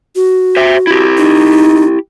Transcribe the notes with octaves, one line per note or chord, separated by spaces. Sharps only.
F#4
C5 E5
E4 G4
D#4